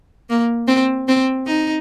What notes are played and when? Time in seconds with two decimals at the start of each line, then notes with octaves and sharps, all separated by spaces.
0.30 A#3
0.68 C4
1.08 C4
1.47 D#4